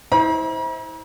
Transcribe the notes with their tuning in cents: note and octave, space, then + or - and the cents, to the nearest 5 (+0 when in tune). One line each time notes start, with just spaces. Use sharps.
E4 -35 C5 +0 A#5 +45